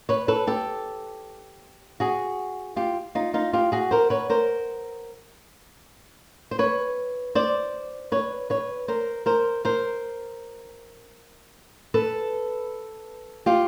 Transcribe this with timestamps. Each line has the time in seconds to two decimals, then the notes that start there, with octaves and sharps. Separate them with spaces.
0.09 B4 C#5
0.28 A4 B4
0.47 G4 A4
2.00 F#4 G#4
2.76 F4 G4
3.15 D#4 F4
3.34 D#4 F4
3.53 F4 G4
3.72 F#4 G#4
3.91 A#4 C5
4.10 B4 C#5
4.30 A#4 C5
6.51 C5
6.59 B4 C#5
7.35 C5 D5
8.12 B4 C#5
8.50 B4 C#5
8.88 A#4 C5
9.26 A#4 C5
9.65 A#4 C5
11.94 A4 B4
13.46 F4 G4